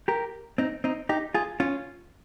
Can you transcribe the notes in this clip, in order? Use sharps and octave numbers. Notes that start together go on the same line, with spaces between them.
G4 A#4
C4 D#4
C4 D#4
D#4 G4
F4 G#4
C#4 F4